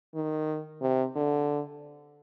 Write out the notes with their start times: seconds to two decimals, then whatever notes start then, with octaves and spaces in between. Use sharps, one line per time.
0.15 D#3
0.82 C3
1.15 D3